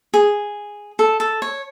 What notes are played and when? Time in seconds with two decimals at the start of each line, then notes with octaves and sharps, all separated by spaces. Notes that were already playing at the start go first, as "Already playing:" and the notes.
0.14 G#4
0.99 A4
1.20 A4
1.42 C#5